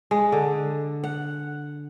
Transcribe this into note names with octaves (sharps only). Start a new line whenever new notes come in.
G#3
D3
F#5